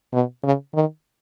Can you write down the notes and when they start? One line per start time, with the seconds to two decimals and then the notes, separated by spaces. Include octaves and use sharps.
0.13 B2
0.44 C#3
0.74 D#3